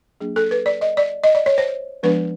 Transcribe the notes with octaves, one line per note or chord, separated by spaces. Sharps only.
F#3 A#3 D4 G#4
A4
B4
D5
D#5
D5
D#5
D5
C#5
C5
F3 G#3 B3 D4 B4